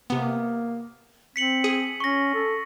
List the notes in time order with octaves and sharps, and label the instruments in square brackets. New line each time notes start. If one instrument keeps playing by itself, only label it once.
[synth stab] C3 B3 [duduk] A#3
[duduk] C4 [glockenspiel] B6 C#7 F#7
[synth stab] G#4 [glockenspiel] D#7
[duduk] C#4 [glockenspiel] C#6 A#6
[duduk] A4